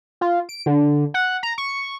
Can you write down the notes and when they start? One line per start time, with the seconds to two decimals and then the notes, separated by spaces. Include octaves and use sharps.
0.21 F4
0.49 D7
0.66 D3
1.14 F#5
1.43 A#5
1.58 C#6